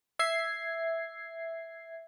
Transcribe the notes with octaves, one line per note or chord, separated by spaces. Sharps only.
E5 G#6 C7